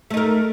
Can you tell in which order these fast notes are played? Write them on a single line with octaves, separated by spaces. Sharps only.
A3 D#4 A#4